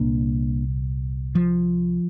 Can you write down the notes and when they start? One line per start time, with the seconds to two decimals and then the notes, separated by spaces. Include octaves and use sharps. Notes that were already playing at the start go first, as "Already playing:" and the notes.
Already playing: C2 A#2 A#3 D4
1.35 F3